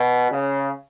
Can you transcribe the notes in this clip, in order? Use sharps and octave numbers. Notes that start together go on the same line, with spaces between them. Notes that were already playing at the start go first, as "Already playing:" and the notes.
Already playing: B2
C#3